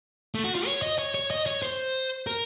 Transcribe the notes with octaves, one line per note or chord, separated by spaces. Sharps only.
A3
F#4
F4
C#5
D#5
C#5
C#5
D#5
C#5
C5
A#4